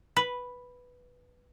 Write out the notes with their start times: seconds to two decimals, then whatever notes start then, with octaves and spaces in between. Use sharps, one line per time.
0.17 B4